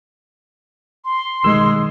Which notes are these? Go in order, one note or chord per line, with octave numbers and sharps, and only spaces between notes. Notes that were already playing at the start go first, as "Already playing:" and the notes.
C6
B1 D#3 G#3 E6